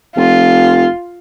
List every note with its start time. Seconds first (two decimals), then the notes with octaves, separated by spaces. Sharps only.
0.17 F1 F4